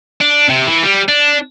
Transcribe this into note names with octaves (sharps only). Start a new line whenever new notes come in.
D4
C3
E3
G3
D4